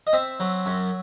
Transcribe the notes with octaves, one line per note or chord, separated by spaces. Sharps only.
D#5
C4 E5
F#3
F#2